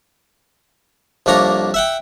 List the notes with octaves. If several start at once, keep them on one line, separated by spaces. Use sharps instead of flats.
C2 F2 A#3 D4 C#5 A#5
E5 F#5 G5